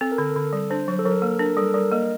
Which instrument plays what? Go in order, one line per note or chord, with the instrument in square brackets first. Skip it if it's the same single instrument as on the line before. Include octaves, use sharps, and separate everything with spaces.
[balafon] C4 [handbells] A4
[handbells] A#4
[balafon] D3 [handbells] A4
[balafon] D3
G3
[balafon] D4 [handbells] C5
[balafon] F#3
[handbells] A4
[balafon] F#3 [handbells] A#4
[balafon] A#3 [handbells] A4
[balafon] D4 [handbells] A#4
[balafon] G3 [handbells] A4
[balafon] G3 [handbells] A#4
[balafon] A#3 [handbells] D#5